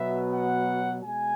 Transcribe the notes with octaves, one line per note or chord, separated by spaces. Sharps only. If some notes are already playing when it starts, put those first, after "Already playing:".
Already playing: B2 F#3 B3 E5
F#5
B2 G#3 G#5